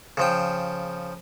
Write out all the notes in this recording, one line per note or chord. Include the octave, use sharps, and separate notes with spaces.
C#3 F3 G5